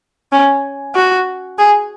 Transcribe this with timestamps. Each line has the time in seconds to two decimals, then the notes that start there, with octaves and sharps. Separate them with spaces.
0.32 C#4
0.95 F#4
1.58 G#4